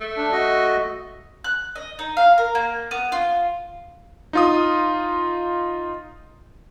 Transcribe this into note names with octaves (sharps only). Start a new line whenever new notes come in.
A3
D4
F#4 D#5
F#6
D#5
D#4
F5
A#4
A#3
B3
F4
D#4 F4 D#6